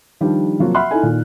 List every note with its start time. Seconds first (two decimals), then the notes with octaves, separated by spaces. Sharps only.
0.21 D#3 F3 G3 D4 G4
0.60 C3 F3 F#3 A#3 F4 F#4
0.74 E5 F#5 B5 C6 F6 F#6
0.91 D#4 E4 A4 G#5
1.03 A#2 D#3